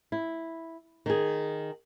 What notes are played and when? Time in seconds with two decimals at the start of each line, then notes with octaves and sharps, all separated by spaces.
0.12 E4
1.06 D#3 G#4